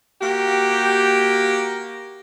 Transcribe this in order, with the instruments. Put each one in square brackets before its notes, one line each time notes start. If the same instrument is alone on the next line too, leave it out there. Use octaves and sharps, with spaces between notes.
[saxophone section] A#3 F#4 G4